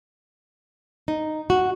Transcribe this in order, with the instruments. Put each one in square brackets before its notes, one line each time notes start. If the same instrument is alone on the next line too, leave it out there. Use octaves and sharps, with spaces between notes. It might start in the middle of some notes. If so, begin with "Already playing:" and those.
[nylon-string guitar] D#4
F#4